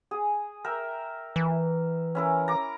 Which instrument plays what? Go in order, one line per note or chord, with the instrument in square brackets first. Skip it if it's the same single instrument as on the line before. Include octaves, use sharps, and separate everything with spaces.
[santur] G#4
A#4 E5 G5
[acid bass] E3
[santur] C#4 E4 A#4
A#5 D6